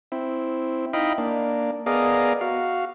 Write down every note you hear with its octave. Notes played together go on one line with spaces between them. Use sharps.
C4 E4
D#4 E4 D#5 F5 G5 B5
A#3 D4
B3 G#4 A#4 D5 D#5 F5
F#4 F5